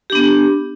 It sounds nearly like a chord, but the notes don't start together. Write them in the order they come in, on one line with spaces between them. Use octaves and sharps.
G4 D4 B3